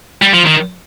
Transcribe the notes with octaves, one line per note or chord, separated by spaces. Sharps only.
G3
F3
D#3